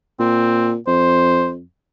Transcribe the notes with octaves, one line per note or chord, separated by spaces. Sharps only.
A#2 C4
F2 C5